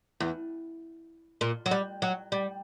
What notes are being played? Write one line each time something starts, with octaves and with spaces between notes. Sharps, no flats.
E2
A#2
F#3
G3
F#3
G3